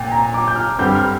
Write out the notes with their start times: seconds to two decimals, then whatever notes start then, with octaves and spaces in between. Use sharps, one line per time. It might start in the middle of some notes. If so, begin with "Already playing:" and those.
Already playing: A#2 G5
0.12 A#5
0.34 D6
0.48 G6
0.56 F6
0.78 G2 D3 G3 C4 G4 G6
0.95 F6